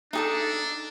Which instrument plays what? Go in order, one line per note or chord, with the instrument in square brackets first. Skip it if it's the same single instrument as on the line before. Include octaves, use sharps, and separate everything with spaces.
[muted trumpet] D4 [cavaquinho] D#4 G#4 A4